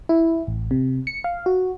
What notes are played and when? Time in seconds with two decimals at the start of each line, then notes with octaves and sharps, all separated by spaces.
0.09 E4
0.47 A1
0.71 C3
1.07 C#7
1.24 F5
1.46 F#4